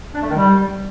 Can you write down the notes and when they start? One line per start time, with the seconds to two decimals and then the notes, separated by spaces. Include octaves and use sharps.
0.14 D4
0.22 A3
0.29 D#3
0.37 G3